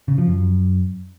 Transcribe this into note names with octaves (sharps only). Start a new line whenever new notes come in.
C#3
F3
F#2